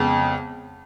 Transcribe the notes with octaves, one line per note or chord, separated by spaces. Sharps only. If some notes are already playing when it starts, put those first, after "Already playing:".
Already playing: F2 C#3 G#3 B3